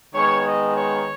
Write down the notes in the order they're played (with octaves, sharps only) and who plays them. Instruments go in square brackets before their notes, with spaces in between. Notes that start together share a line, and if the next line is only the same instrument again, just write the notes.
[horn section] D#3 G#3 B3 C#5
D#5
C#5